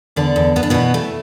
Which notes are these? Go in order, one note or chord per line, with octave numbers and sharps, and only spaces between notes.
E2 D3 D4
E2
E2 B3
D4
B2 E3 B3
E3 A3